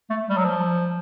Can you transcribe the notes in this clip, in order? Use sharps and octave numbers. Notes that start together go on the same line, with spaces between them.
A3
G3
F#3
F3